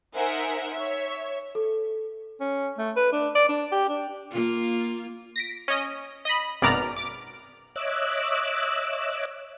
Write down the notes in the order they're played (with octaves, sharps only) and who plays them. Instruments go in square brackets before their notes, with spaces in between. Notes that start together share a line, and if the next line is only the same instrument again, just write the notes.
[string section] D#4 A#4 C5 E5 F#5 G#5
C#5 E5
[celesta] A4
[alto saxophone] C#4
A3
B4
D4
D5
D4
G4
D4
[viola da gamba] A#3 F4
[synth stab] A#6 B6 D7
C#4 D#5
D#5 B5
G#1 F#2 B2 D5 A#5 F6
D6
[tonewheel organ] C#5 D#5 E5 D6 E6 F#6